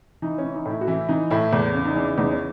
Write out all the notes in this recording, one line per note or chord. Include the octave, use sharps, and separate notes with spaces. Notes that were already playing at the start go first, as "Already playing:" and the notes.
E3 D#4
C#4
E3
D#4
A2
E4
F#4
E3 E4
E3 D#4
A2 E4
E2
C#3
D#4
E3
E2 D#4
C#4